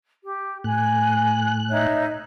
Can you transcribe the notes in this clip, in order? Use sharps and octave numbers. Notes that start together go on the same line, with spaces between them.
G4
A2 G#5 F#6
D#4 C#5 E5